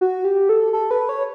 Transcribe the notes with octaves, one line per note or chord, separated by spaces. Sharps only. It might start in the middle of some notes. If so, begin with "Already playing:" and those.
F#4
G4
A4
A4
B4
C#5